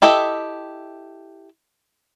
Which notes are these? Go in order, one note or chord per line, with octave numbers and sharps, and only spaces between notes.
E4 G4 A4 D#5 E5